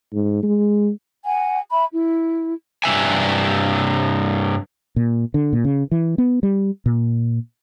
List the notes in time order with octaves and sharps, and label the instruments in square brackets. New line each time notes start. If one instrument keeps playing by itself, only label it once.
[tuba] G#2
G#3
[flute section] F#5 G#5
E5 B5
E4
[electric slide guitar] G2 C3 E5 G#5
[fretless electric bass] A#2
D3
A#2
C#3
E3
B3
G3
A#2